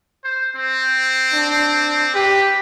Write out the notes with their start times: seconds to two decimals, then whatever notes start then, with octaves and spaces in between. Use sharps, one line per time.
0.24 C5
0.56 C4
1.33 D4
2.15 G4 B4